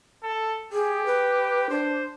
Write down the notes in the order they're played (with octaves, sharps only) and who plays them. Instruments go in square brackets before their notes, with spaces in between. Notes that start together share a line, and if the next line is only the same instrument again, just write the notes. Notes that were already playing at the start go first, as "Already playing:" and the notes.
[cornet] A4
[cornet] G4 [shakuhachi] G#4
[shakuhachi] B4
[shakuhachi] D4 [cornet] C5